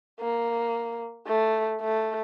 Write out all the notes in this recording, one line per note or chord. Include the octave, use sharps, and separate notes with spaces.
A#3
A3
A3